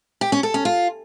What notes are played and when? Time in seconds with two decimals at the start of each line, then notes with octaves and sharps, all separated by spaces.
0.21 G4
0.32 C#4
0.43 A4
0.54 C#4
0.65 F4